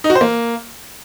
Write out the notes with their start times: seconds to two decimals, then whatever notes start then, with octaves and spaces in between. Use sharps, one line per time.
0.04 D#4
0.10 F#4
0.15 C5
0.21 A#3